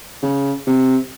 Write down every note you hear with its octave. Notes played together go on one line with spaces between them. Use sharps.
C#3
C3